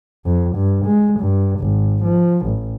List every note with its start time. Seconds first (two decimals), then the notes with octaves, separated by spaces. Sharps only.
0.26 F2
0.56 G2
0.86 G#3
1.20 G2
1.60 G#1
2.04 F3
2.46 A1